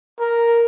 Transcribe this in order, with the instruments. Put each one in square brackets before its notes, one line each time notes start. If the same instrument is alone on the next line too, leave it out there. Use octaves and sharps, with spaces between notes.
[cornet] A#4